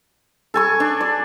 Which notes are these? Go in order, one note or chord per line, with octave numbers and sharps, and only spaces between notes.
A4 G#5 C#6
D4
D5